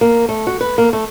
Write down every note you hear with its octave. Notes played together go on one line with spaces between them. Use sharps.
A#3
A3
F#4
B4
A#3
A3